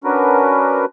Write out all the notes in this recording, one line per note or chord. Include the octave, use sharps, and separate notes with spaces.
C#4 D4 F#4 A#4 B4